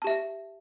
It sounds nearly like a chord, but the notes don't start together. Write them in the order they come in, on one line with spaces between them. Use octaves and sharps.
A5 G4 E5